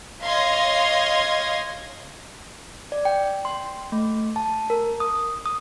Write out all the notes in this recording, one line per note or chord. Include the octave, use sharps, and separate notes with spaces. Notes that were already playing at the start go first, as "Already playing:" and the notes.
C#5 D#5 F5 C6 G#6 A#6
D5
G5
C6
A3
A5
A#4
D#6
D#6